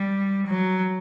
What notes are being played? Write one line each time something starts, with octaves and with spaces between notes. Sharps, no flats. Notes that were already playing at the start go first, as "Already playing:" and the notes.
Already playing: G3
F#3